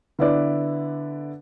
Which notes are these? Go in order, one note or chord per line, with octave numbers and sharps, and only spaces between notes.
D3 B3 E4 B4 D5